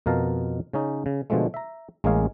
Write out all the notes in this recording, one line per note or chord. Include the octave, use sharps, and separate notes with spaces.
F2 B2 A#4 F5 A5
C#3 C#4 D#4
C#3
B2 D3 F3 G#3 A3
E5 A#5
A1 G#3 A#3 C#4 G#4 F5